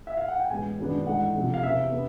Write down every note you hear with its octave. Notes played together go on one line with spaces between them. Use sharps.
E5
F5
F#5
G5
A2 E3 G#3 B3 G#5
F#2 D#3 G#3 B3 D4
G#2 E3 A3 D4 F#5
C3 F3 A3
F5
E2 C3 E3 E5
B3